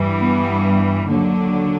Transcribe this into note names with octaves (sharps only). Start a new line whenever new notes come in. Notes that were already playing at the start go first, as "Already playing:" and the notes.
Already playing: G2 E3 G3
B3
D#2 D3 F#3 D4